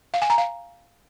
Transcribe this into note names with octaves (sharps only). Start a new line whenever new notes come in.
F5
G#5
A#5
F5